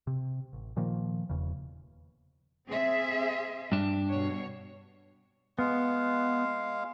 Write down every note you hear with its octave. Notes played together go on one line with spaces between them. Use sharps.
C3
A1
A#2 D#3 F3 A#3
E1 E2 C#3
C4 G#4 E5
G2 D4
B2 C#5
G#3 B3 F5